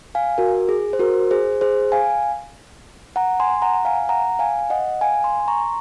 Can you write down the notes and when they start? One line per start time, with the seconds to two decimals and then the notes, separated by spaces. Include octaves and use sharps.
0.15 F5 G#5
0.38 F#4 A#4
0.69 G#4
0.93 C5
0.99 F#4 A#4
1.31 G#4 C5
1.61 G#4 C5
1.92 F5 G#5
3.16 F#5 A#5
3.40 G#5 C6
3.62 F#5 A#5
3.85 F5 G#5
4.09 F#5 A#5
4.39 F5 G#5
4.70 D#5 F#5
5.01 F5 G#5
5.24 G#5 C6
5.40 C6
5.48 A#5 C#6